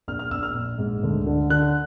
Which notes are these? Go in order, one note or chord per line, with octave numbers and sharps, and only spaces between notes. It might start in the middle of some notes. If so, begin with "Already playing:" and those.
A#1 F6
F6
A#1 E6
F6
A#1
G#2
D2
D3
D3 F#6